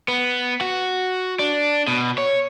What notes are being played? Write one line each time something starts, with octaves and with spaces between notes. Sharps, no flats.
B3
F#4
D4
B2
C#5